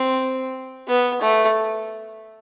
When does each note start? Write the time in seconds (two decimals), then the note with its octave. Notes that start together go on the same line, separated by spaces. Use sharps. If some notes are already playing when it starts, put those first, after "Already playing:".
Already playing: C4
0.87 B3
1.21 A3